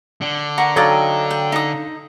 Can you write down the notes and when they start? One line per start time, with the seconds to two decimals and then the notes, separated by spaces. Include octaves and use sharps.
0.21 D3
0.58 A#4 F#5 C#6
0.76 F#3 D#4 A4 D5 D#5 F5 G5 A#5
1.31 G5
1.52 D#4 D#6